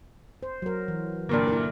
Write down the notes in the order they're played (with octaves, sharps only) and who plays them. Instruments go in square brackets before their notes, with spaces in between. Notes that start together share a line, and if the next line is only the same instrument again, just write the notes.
[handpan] C5
F#3 A#4
E3
[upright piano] G2 A#2 A#3 [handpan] D3 A#4 D5
[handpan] E4 A#4